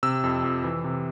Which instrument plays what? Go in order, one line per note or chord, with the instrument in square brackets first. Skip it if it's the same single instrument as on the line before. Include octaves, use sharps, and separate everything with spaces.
[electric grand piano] C3 E6
F2
F2
E3
C3